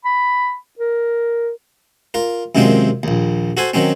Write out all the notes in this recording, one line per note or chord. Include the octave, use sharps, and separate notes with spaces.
B5
A#4
F4 A#4
F#2 C3 D#3 G#3 C4 F4
A#1 D#2
F#4 A4 C5 G#5
D#3 F#3 C4 C#4